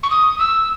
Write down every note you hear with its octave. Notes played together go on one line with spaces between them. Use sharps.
C#6
D#6
E6